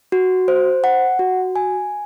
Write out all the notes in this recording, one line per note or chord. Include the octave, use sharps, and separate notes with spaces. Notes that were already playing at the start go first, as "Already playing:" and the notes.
F#4
C5
F#5
F#4
G#5